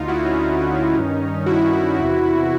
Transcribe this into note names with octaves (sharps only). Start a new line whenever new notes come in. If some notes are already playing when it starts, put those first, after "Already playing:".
Already playing: D2 D3 D#4 F4
E4 F#4
C#4 D#4
G2 D#3
E4 F#4
E2 C3 E3